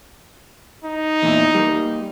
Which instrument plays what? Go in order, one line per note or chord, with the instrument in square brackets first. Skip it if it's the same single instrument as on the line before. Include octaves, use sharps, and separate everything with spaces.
[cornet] D#4
[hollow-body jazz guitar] E2 A#2 E4
G3 A#3